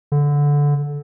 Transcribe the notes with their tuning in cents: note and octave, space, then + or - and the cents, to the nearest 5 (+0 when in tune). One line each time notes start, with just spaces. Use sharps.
D3 -15